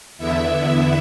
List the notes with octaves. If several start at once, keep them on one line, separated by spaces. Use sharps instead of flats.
E2 D3 B3 E4 E5